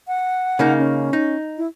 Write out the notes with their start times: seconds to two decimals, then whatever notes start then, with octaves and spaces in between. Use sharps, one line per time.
0.08 F#5
0.59 C#3 A#3 D#4
0.79 C#4
1.13 D#4
1.58 E4